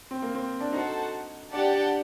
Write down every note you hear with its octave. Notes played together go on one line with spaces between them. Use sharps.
C4
A#3
C4
D4
D#4 F#4 A4 C5 F#5 A5
D4 G4 D5 F#5 A5
D4